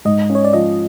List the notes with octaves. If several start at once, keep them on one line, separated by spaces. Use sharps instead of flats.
G#2 D#5
C#4
C#5
D5
F3 D#5